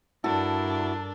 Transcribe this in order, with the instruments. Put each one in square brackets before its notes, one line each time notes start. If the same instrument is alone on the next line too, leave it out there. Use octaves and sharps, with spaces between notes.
[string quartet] G2 D4 A#4 [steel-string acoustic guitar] E4 F#4 [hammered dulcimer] A4